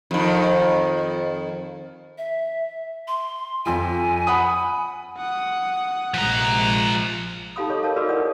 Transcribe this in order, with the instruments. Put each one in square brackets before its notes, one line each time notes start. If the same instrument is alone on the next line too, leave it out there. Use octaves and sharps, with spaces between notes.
[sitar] F2 D#3
[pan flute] E5
C6
[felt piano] F2 F3 [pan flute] G#5
[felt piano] F#5 B5 D#6
[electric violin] F#5 D#6
[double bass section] A#1 C3 G#3 [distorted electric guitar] F3 A#5 [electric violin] F#6
[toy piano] D#4 G4 A4 F5 B5 D#6
G#4 A4 C#5 D#5
A#4 C#5 F5 A5
F#4 G#4 A#4 B4 D5 D#5
D4 E4 C#5 F#5 D#6